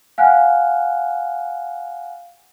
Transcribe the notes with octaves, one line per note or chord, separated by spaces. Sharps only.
F5 F#5 G#5 F6 F#6